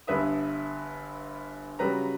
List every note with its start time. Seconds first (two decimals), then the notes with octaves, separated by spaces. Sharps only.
0.07 G1 G2 B4 E5 D#6
1.79 C#3 F#3 G3 B4 A#5